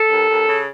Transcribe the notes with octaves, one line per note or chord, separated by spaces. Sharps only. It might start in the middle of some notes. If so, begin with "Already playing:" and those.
Already playing: A4
D#2
D#2
C#3